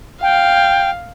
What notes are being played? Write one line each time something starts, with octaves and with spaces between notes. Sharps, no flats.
F5 G5